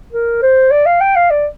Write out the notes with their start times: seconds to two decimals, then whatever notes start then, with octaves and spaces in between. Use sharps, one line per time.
0.13 A#4
0.42 C5
0.71 D5
0.86 F5
1.01 G5
1.16 F5
1.31 D5